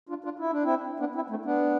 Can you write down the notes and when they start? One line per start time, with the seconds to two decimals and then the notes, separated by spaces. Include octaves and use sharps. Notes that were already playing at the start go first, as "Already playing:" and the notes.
0.09 D4 F4
0.24 D4 F4
0.39 E4
0.51 D4
0.64 C4 E4
1.00 B3 D4
1.15 C4 E4
1.30 A3 C4
1.45 B3 D4